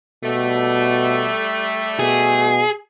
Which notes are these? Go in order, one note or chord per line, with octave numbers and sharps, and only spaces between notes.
B2 G3 A3
B2 G#4